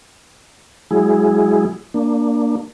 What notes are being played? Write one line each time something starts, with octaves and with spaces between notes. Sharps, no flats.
F#3 G#3 E4 G#4
A#3 D4